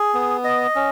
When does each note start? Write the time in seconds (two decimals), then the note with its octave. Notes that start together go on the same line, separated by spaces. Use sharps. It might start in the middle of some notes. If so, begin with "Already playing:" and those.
Already playing: G#4
0.14 B3
0.44 D#5
0.75 C#4